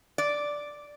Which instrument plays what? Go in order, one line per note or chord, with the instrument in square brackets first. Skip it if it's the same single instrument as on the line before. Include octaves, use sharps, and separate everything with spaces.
[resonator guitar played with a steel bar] D5